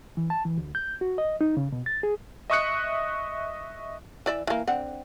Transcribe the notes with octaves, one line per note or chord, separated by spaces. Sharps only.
E3
A5
E3
D2
G6
F#4
D#5
D#4
C#3
B2
A6
G#4
D#5 E5 C#6 D#6 F#6 C#7
E3 D5 E5
E3 A#3
D3 C4 F#5